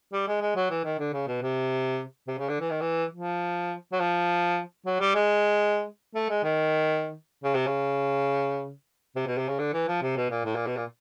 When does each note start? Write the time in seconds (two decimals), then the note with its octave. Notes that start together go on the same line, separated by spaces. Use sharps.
0.13 G3
0.28 G#3
0.41 G#3
0.56 F#3
0.70 E3
0.84 D#3
0.99 D3
1.13 C#3
1.27 B2
1.42 C3
2.28 C3
2.39 C#3
2.49 D3
2.60 E3
2.70 D#3
2.81 E3
3.14 F3
3.92 F#3
4.00 F3
4.86 F#3
5.00 G3
5.14 G#3
6.15 A3
6.30 G#3
6.44 D#3
7.44 C#3
7.55 C3
7.67 C#3
9.16 C3
9.27 B2
9.37 C3
9.48 C#3
9.59 D3
9.73 E3
9.88 F3
10.02 C3
10.16 B2
10.31 A#2
10.45 A2
10.55 A#2
10.66 B2
10.77 A#2